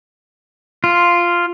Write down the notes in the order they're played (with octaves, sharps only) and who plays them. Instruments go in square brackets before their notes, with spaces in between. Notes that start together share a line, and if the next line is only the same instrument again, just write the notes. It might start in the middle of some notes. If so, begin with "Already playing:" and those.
[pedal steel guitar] F4